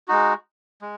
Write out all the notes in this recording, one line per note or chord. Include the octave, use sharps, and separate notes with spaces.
G#3 D#4 F#4
G#3